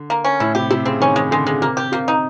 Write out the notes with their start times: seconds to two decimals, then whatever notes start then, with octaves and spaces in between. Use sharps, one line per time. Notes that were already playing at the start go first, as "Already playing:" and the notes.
Already playing: D3
0.10 A#3
0.24 C#4
0.40 A2 E4
0.55 C3 G4
0.70 C3 E4
0.85 C#3 C4
1.00 D#3 C#4
1.16 D#3 G#3
1.31 D3 G#3
1.47 C#3 G#3
1.62 C3 A#3
1.77 G4
1.92 C3 A#3
2.08 D#4